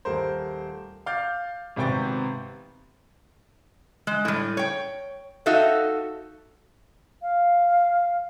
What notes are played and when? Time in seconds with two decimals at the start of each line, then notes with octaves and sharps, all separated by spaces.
0.05 D#1 A3 A#4 C5
1.06 F5 D6 F6 G6 A6
1.76 G#1 C3 B3 G5 C#6 A6
4.07 G#3
4.25 A2 G3
4.57 C#5 G5
5.46 D#4 F#4 A4 E5 F5
7.22 F5